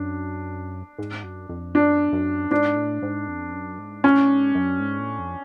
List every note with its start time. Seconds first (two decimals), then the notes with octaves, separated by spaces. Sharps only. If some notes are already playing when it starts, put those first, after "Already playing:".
Already playing: F#2 D4
0.99 G#2
1.24 F#2
1.49 F2
1.75 F#2 D4
2.12 F#2
2.51 G#2 D4
2.76 A2
3.02 G#2
3.28 F2
3.53 F#2
3.79 G#2
4.04 A2 C#4
4.29 G#2
4.55 F#2
4.80 G#2
4.99 A2
5.19 F2